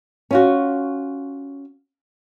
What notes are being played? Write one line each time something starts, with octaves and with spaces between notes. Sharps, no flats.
C#4 F4 F#4